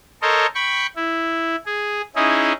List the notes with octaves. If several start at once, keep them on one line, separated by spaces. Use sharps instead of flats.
A4 A#4 C5 C#5 D#5
G5 B5 C#6
E4
G#4
C#4 D#4 E4 G#4